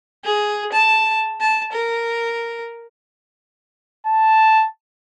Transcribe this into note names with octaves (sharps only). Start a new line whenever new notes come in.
G#4
A5
A5
A#4
A5